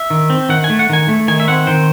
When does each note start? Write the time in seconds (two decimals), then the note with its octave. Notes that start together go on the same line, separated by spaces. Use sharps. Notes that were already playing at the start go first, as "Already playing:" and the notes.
Already playing: E5
0.10 D#3
0.30 C4
0.49 D#3 F#5
0.64 G#5
0.70 A3
0.79 F#5
0.89 D#3 G#5
1.08 A3
1.28 D#3 G#5
1.40 E5
1.48 C4 F#5
1.67 D#3 C5